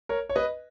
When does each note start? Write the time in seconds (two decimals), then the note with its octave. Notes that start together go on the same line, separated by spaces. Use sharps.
0.09 A#4 C#5
0.29 C#5
0.36 B4 D#5